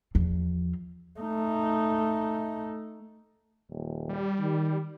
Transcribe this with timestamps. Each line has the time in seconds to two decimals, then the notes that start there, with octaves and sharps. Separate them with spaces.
0.15 E2 F3
1.20 A3 D#4
3.70 D#1
4.09 G3
4.39 D#3